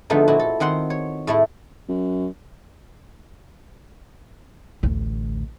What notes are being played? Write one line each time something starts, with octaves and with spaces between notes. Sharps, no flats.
D3 F3 A3 B3 D#4
A#2 E4 F#4
A4
D#3 C4 F#5 C6
C#5
A2 A3 E4
F#2
A1 D2